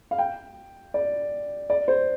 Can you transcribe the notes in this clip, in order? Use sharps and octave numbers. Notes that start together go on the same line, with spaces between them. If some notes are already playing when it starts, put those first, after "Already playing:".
F5
G5
D5
D5
C5